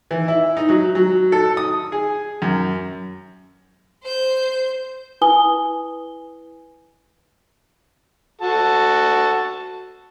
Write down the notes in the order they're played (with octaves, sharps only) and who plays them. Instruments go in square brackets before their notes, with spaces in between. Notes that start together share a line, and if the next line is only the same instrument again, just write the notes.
[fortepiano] E3
E4
D#4
F#3
F#3
A4
D#6
G#4
F#2
[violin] C5 G6
[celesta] E4 B4 G#5 D#6 G7
[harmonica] F#4 A4 A5